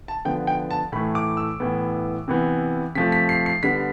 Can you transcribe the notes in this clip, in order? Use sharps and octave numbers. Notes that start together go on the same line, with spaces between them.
A5
D3 F3 B3 G5
G5
A5
A2 E3 A3 B5
D6
E6
A2 E3 B3
C3 E3 B3
C3 F3 A3 B6
B6
C7
C7
D3 G3 B3 B6